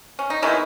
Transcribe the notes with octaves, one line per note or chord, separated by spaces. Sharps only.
C#4
D#4
D#3 G#3 B3 C#4 E4